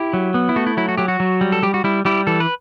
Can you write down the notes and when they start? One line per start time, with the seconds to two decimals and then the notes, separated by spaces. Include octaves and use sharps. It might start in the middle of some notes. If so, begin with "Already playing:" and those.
Already playing: E4 G4
0.13 F#3
0.34 B3
0.49 E4
0.56 A3 F#4
0.67 E4
0.77 F#3 E4
0.88 F#4
0.97 F#3 G4
1.08 F#4
1.20 F#3
1.41 G3
1.52 A4
1.62 G3 G4
1.74 F#4
1.84 G3 E4
2.05 G3 E4 G4
2.27 E3 A4
2.40 B4